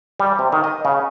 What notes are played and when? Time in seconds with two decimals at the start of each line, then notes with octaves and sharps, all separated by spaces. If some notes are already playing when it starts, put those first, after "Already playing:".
0.20 G3
0.39 C3
0.52 D#3
0.64 D#5
0.85 C#3